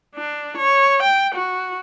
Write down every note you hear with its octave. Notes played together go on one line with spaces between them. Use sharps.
D4
C#5
G5
F#4